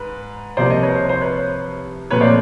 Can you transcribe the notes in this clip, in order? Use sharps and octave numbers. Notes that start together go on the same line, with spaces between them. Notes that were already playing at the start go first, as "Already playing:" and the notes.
Already playing: G#2 B4
C2 C3 F3 A#3 C5 D5
C#5 D#5
B4 C#5
C5
C5
B4 C#5
A#2 F3 A3 C4 B4 C#5
C5 D5